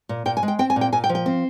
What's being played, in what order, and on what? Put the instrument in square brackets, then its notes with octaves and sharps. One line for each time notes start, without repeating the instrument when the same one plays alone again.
[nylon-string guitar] A#2
A#2 G5
G#5
G#3
G5
C4 G5
G#5
A#2
G5
A#2 G#5
G5
F3
G5
C4